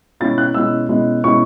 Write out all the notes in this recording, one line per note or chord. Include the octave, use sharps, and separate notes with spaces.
B2 G#3 C#4 E4 A6
F#6
B2 G#3 C#4 E4 E6
B2 G#3 C#4 E4
B2 G#3 C#4 E4 C#6